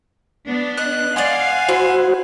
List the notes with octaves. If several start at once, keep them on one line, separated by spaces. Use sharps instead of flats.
B3 D4
D#5 F#6
D5 D#5 F5 F#5 G#5 C6
E4 F#4 C5